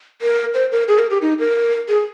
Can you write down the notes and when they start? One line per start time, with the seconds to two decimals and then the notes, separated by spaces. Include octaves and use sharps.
0.22 A#4
0.54 C5
0.72 A#4
0.88 G#4
0.99 A#4
1.10 G4
1.22 D#4
1.39 A#4
1.88 G#4